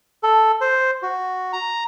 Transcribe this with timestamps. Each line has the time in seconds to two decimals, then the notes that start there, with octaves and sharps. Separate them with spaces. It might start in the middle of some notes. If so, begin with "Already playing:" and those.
0.23 A4
0.61 C5
1.02 F#4
1.53 A#5